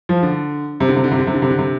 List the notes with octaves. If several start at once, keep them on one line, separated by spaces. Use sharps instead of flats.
F3
D3
C3
D3
C3
D3
C3
D3
C3
D3
C3
D3
C3